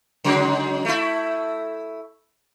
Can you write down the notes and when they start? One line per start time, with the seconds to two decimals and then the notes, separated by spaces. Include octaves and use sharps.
0.24 C#3 F#3 G#3
0.85 A3 E4